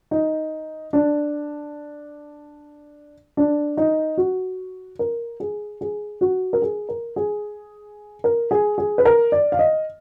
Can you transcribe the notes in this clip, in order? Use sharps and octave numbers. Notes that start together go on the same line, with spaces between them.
D#4
D4
D4
D#4
F#4
A#4
G#4
G#4
F#4
A#4
G#4
A#4
G#4
A#4
G#4
G#4
B4
A#4
D5
F5
D#5